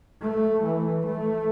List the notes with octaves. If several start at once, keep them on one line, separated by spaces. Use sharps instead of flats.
A3
E3
A3